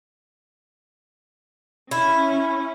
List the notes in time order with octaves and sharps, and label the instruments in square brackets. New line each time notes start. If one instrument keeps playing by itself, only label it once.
[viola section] C#4 [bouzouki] E4